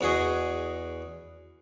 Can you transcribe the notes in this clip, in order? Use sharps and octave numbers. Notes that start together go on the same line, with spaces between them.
E2 F#4 G#4 D#5